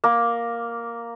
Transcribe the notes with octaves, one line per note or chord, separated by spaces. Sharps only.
A#3